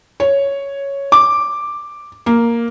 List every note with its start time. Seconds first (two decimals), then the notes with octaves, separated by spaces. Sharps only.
0.20 C#5
1.12 D6
2.26 A#3